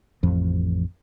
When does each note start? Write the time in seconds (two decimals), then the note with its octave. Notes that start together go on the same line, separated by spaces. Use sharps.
0.23 A1 F2 F3